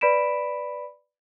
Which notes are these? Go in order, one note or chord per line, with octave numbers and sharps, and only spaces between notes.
B4 D5 B5 B6 D7 E7